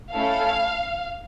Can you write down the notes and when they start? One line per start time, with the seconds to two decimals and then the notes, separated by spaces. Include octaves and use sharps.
0.13 A3 C#4 E4 A4 F5